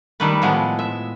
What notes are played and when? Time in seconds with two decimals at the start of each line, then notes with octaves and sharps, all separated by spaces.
0.20 D#3 G3 A3 B4
0.42 A2 F3 G#3 B3
0.79 E5